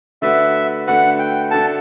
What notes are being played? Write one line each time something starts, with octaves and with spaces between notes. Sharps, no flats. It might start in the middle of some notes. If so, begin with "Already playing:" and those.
D3 A3 D4 F#4 B4 E5
D3 A3 D4 F#4 B4 F#5
G5
D3 A3 D4 F#4 A4 A5